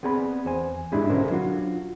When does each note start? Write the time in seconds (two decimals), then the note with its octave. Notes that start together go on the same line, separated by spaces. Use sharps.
0.03 B3 C4 G#4 D5 A#5 B5
0.45 E2 C5 G#5
0.92 G#2 G#3 D4 E4 G4 G#4
1.09 B1 D3 C#4 D4 A#4 C5
1.31 F#3 D4 F4 F#4